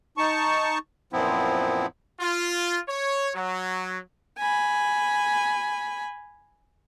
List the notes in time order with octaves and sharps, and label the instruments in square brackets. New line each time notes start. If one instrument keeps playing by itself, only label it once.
[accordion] D#4 A5 C#6
[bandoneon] F#2 A#2 F3 B3 C4 E4
[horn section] F4
C#5
F#3
[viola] G#5 B5